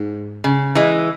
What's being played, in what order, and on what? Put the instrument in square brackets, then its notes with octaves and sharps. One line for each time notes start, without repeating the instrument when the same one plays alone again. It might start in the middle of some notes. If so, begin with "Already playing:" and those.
Already playing: [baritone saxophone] G#2
[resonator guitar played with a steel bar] C#3
E3 G#3